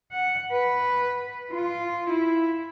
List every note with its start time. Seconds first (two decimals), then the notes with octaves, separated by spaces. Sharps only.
0.12 F#5
0.52 B4
1.51 F4
2.10 E4